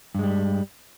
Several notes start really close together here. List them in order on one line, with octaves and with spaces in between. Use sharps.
G2 G#3 G3